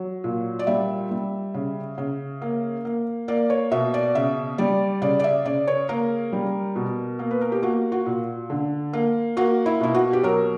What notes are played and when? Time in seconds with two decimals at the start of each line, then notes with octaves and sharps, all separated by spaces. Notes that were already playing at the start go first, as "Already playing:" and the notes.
Already playing: F#3
0.24 A#2
0.59 D5
0.67 G3 E5
1.11 G3
1.54 C#3
1.98 C#3
2.42 A#3
2.85 A#3
3.28 A#3 D5
3.50 C#5
3.71 B2 E5
3.94 D5
4.15 C#3 E5
4.58 G3 D5
5.02 C#3 D5
5.20 D5
5.24 E5
5.45 C#3 D5
5.67 C#5
5.89 A#3 A#4
6.33 G3
6.76 B2
7.19 A#3
7.31 B4
7.41 A#4
7.52 G4
7.63 A#3 F#4
7.92 F#4
8.06 A#2
8.50 D3
8.93 A#3
9.37 A#3 F#4
9.66 E4
9.80 B2 E4
9.95 F#4
10.13 G4
10.23 F#3 A#4